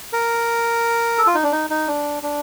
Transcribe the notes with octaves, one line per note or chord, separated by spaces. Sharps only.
A#4
A4
F4
D#4
D4
D#4
D#4
D4
D4